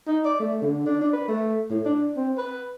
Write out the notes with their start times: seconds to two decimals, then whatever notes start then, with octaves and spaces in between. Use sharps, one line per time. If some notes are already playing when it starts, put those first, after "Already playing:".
0.07 D#4
0.25 D5
0.40 A3
0.62 D3
0.86 D4
1.01 D4
1.13 B4
1.28 A3
1.70 A2
1.86 D4
2.16 C4
2.38 B4